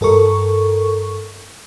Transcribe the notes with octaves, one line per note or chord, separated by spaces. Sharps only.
G2 A4 A#4 C#6